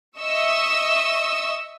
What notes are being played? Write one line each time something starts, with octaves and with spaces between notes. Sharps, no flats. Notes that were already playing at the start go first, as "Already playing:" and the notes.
D#5 E5 C#6 E6